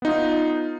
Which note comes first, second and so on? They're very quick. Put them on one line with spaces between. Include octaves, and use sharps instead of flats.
B3 D#4 F4